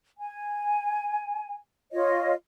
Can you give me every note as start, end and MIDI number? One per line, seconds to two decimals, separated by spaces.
0.19 1.55 80
1.93 2.32 65
1.93 2.32 73
1.93 2.32 75